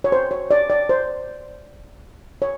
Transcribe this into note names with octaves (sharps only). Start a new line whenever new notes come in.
C#5
C5
C#5
D5
D5
C5
C#5